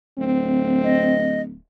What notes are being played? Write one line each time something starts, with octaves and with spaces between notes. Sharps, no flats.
D1 C4
D#5